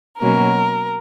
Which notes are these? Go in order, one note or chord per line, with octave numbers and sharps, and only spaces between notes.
B2 F#3 A#3 C#4 A#4